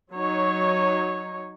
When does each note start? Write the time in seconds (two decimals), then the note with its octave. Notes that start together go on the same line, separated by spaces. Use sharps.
0.12 F#3 D#4 C#5